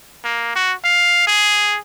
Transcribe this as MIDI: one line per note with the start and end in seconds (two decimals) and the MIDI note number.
0.24 0.51 58
0.55 0.73 66
0.84 1.24 77
1.27 1.78 68